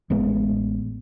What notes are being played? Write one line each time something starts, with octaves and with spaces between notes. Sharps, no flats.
A1 A2 G#3 B3